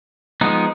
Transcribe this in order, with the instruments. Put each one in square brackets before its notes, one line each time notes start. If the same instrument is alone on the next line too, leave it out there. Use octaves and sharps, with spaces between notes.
[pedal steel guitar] F3 G#3 B3 D#4